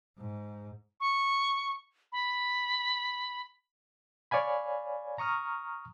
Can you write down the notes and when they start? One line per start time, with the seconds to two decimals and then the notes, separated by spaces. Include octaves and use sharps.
0.19 G#2
1.00 C#6
2.12 B5
4.31 C#5 D5 F5 G#5 B5
5.18 A#5 C#6 D#6 F6